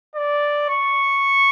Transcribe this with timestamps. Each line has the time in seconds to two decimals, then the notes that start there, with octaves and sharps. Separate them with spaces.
0.16 D5
0.69 C#6